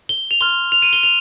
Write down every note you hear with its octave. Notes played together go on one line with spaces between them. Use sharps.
G7
F7
C6 F6 G7
F7
D#7
G7
F7